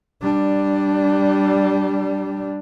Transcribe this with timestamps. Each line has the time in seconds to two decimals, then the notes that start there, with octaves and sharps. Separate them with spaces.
0.22 G3 D4